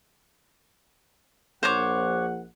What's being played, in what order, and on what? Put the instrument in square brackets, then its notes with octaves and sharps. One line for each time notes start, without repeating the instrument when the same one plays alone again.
[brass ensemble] A#1 F#5 [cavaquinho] C5 C#5 D6